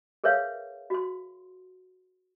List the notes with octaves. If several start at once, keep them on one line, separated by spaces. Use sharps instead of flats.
G#4 A#4 B4 C#5 E5 F5
F#4 C6